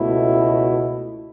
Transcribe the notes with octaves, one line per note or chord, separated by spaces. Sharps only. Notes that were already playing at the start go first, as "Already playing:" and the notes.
Already playing: C#2 B2 A3 E4